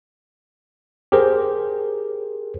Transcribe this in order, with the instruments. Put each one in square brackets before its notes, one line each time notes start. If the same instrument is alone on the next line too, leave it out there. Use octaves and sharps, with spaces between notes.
[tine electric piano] G4 G#4 A#4 C5